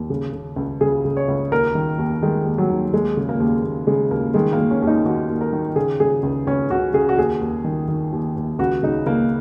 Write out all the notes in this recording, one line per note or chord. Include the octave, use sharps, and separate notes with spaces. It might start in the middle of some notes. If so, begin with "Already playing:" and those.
Already playing: D#2
C#3
C#3
C#2
C#3 G#4
C#3
C#5
C#2
D#2 A#4
D#3
D#2
D#3 G#3
D#2
F#3
D#2
D#2 G#3
C#3
A#3
D#2
D#2
C#3 G#3
D#2 A#3
D#3 G#3
A#3
D#3
C#4
D#2
D#4
D#2 F#4
D#2
A#4
D#3
C#3 G#4
C#3 G#4
C#2
C#2 C#4
C#2 F#4
C#3 G#4
F#4
D#2 G#4
D#2
D#3
D#3
D#2
D#2
C#2 F#4
C#3 D#4
C#3 A#3